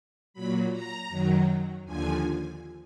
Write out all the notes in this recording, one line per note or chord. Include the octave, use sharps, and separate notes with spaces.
A#2 F#3 B5
A#5
F#2 D#3 F#3
D#2 D3 F3 G#5